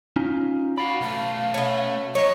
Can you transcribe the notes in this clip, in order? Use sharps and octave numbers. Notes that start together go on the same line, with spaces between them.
C#4 D#4 F4
F#4 D5 F5 B5
B1 A3 F5
B2 A3 C#4
F#3 C#5 D#5